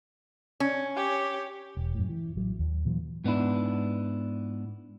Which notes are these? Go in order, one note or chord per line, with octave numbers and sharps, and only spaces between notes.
C#4
G4 C#5
E1
F#2 A2
E3
A1 F#3
D#2
A#2 E3 F#3
G#2 B3 D4 E4